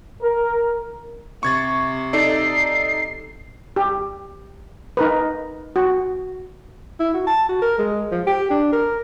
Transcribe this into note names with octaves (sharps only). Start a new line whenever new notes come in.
A#4
C3 C#6 G#6 A6
D#4 A4 D5 C7
G4
D#4 A#4 B4
F#4
E4
F#4
A5
F#4
A#4
G#3
F3
G4
D4
A#4